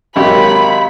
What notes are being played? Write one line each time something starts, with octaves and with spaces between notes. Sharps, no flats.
G#1 F#3 G4 A#4 C#5 F5 B5
F5 A#5